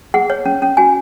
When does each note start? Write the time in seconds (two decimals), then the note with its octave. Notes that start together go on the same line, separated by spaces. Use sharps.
0.14 G#4 F#5
0.30 C#5
0.45 C#4
0.62 C#4
0.77 F#4 G#5